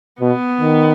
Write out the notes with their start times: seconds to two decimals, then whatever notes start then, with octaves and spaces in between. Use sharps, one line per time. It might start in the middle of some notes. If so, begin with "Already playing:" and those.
0.21 B2 B3
0.61 D#3